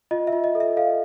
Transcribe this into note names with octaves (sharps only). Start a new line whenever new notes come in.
F4 D#5
E5
F4
D#5
A4
E5
A4 D#5 F5